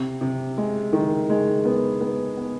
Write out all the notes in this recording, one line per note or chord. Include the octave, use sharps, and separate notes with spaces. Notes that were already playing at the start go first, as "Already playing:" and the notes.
Already playing: C3
C3
G#3
D#3
G#3
B3
B3
B3